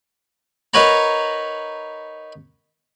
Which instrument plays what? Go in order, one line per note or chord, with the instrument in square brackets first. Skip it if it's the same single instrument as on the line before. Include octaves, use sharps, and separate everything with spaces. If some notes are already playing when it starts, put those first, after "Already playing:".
[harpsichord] D#4 A#4 B4 C#5 F#5 A#5